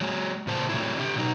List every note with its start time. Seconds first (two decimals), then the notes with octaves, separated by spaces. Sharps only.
0.01 F#3 G#3
0.47 A#2 C#3 C5 A5
0.69 C3 F#3 A3 E4
0.97 D3 G4
1.16 B2 F#3 D#4